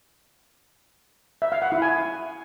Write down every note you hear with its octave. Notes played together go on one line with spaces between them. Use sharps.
E5
F5
F#5
E4
G#5